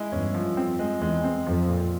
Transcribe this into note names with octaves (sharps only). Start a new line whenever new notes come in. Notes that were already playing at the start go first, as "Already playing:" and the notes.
Already playing: G#3 E4
E2 G2 C#4
F3
F2 C4
G#3
E2 G#3
C4
F2 F3
A#2